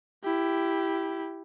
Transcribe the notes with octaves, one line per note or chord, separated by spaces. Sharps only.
E4 G4